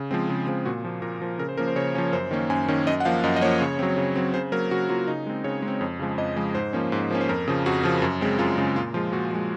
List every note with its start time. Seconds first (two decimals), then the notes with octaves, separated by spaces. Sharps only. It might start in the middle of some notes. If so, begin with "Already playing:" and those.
Already playing: C#3
0.11 F3 G#3 C4
0.29 C#3
0.47 F3 G#3 C4
0.65 A#2 F#4
0.85 F3 A#3
1.02 A#2 A#4
1.22 F3 A#3
1.39 C#3 A#4
1.49 C5
1.57 F3 A#3 C#4 A#4
1.68 C5
1.76 C#3 C#5
1.95 F3 A#3 C#4
2.13 F#2 C5
2.31 D#3 A#3 C#4
2.50 F#2 G#5
2.68 D#3 A#3 C#4
2.87 F#2 D#5
3.00 F#5
3.05 F3 A#3 F5
3.24 F#2 D#5
3.36 D#5
3.41 F3 A#3 C#5
3.61 C#3
3.79 F#3 C4
3.97 C#3
4.16 F#3 C4
4.34 C#3 C5
4.52 F#3 A#3 A#4
4.71 C#3 F#4
4.89 F#3 A#3 F4
5.08 C#3 D#4
5.26 G#3 C4
5.44 C#3 C#5
5.62 G#3
5.68 C4
5.81 F2
6.00 C#3 F3 G#3
6.18 F2 D#5
6.36 C#3 F3 G#3
6.55 G#2 C5
6.73 F3 A#3 C#4
6.92 G#2
7.11 F3 A#3 C#4
7.21 C5
7.29 F2 A#4
7.48 C#3 F3
7.66 F2 F#4
7.84 C#3 F3
8.02 F#2
8.21 C#3 G#3 C4
8.39 F#2 F4
8.58 C#3 G#3 C4
8.76 A#2 F4
8.94 F3 G#3 F4
9.12 A#2 F#4
9.32 F3 G#3